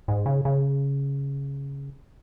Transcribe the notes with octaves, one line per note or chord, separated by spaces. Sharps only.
G#2
C#3
C#3